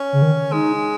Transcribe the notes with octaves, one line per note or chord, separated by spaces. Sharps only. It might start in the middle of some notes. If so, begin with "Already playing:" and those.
Already playing: C#4
C#3
D#3
G#3 D#4